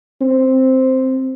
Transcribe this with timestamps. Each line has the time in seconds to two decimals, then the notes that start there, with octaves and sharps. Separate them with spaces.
0.21 C4